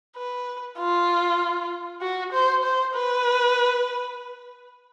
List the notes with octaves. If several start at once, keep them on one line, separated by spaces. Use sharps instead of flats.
B4
F4
F#4
C5
C5
B4